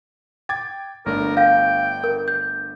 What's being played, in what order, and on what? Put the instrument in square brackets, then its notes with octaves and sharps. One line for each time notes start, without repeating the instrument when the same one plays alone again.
[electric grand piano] G5 D6 G#6 [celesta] A6
[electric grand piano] G1 A3 D4 [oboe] A#4
[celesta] F5 [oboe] G5
[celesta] A#4
G6